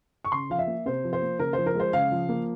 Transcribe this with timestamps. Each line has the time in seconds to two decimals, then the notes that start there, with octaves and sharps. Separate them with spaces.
0.25 C#6
0.32 C#3 C6
0.50 F3 F5
0.59 E5
0.67 A#3
0.85 C3 C5
1.04 F3
1.13 C5
1.21 A#3
1.39 C#3 A#4
1.53 F3 C5
1.66 A#4
1.75 G#3 C5
1.93 C#3 F5
2.11 F3
2.29 A#3